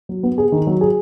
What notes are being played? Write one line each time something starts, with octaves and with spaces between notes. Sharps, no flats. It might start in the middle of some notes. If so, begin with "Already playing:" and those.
F#3
B3
G#4
D#3
F#3
G#4